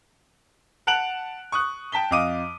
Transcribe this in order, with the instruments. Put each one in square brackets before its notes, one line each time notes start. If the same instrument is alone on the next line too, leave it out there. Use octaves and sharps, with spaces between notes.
[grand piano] F#5 A5 F#6 D7 F7 F#7
C#6 D#6 F#6
G5 A5 B6 G7
F2 D#5 F5 D6 D#6 D#7